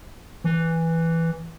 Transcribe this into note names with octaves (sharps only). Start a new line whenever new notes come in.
E3